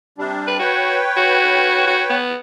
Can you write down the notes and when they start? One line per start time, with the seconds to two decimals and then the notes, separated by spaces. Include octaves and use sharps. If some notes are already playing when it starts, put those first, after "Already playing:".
0.18 C3 G3 D4
0.47 B4
0.59 F#4 B4 C#5 G5
1.17 F#4
1.87 F#4
2.10 B3